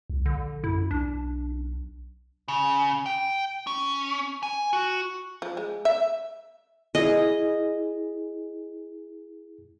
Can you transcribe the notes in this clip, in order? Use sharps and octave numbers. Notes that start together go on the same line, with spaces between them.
C2
A#1 D3
F#2 E4
B1 D4
C#3
G5
C#4
G#5
F#4
F3
G#3
E5
E4 G#4 D#5